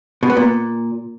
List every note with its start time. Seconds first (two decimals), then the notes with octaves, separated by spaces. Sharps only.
0.23 B2
0.30 B3
0.37 A#2